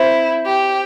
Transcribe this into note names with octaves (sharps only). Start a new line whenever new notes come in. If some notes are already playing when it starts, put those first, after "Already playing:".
Already playing: C4 E4 C5
G4